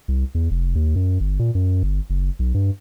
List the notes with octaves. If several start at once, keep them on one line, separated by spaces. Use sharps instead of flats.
C2
E2
F1
D#2
F#2
G1
A#2
F#2
G1
F#1
B1
G2